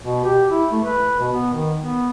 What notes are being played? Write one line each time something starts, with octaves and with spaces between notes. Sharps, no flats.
B2
G4
E4
A3
B4
B2
B3
D#3
B3